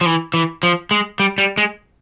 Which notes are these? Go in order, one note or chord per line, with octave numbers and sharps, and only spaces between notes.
F3
E3
E3
F3
G#3
G3
G3
G#3